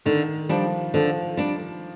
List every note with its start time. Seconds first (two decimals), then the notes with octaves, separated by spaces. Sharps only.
0.06 D3 D#3
0.49 F3 G3 D4
0.94 D3 F3
1.37 G3 D4